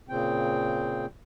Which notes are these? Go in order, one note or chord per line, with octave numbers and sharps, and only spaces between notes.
A#2 C#3 C4 G5